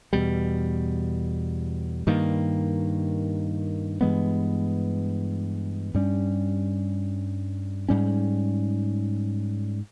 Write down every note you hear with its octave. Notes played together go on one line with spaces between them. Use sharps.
E2 B2 G3
G2 D#3 A#3
G2 E3 G#3 B3
G2 G3 C#4
G#2 G3 C#4